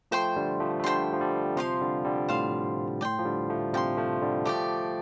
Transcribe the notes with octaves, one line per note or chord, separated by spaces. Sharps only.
F3 A3 C5 G5 C6
D3 G3
F3 A3
A3
D3 G3 C5 G5 C6
F3
D3 G3
C3 F3 C5 F5 C6
D3 G3
D3 G3
A2 C5 F5 C6
A2 D5 G5 C6
F3
D3 G3
F3 A3
C3 F3 D5 G5 C6
F3 A3
D3 G3
F3 A3 G4 D5 G5